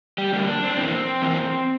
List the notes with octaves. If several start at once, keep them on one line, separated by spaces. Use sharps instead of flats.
G3 G4
F2 D3 G3 A#3 D4
D4
C4
D4
F2 E3 A#3 C4
F2 E3 A#3